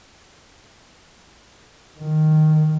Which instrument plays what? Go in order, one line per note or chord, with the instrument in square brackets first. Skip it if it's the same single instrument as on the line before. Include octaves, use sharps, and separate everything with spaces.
[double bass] D#3